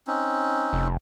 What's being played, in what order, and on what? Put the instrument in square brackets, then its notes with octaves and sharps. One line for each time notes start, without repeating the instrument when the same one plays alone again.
[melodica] C4 C#4 D#4
[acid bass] F1